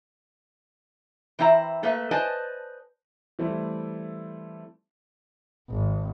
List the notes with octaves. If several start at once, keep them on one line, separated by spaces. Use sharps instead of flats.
E3 C4 E4 E5 A#5
A3 A#3 B4 E5
B4 C5 D5 D#5 G#5 A5
E3 G3 A3 C4 E4
G#1